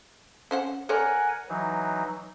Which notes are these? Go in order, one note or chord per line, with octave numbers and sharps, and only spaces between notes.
C#4 C5 F#5
A4 A#4 C#5 D5 F#5 G#5
E3 F#3 D#4